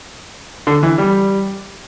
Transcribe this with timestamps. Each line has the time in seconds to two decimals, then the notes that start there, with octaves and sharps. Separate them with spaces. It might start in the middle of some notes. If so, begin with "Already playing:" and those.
0.67 D3
0.83 E3
0.98 G3